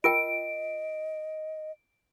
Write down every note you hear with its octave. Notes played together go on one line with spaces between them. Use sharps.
F4 A#4 D#5 G5 D7